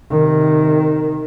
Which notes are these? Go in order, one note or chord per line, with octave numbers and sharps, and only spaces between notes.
C3 D#3